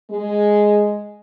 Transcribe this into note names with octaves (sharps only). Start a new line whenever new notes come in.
G#3